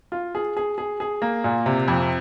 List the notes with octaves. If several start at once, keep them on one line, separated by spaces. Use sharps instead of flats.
F4
G#4
G#4
G#4
G#4
A#3
A#2
C3
F2